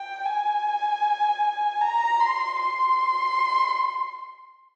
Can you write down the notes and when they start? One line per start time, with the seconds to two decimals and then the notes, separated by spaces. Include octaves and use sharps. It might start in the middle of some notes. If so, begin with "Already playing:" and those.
Already playing: G5
0.25 G#5
1.81 A#5
2.20 C6
2.59 C6